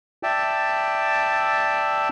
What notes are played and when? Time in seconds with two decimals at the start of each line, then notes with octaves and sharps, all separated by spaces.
0.23 D5 E5 G5 A5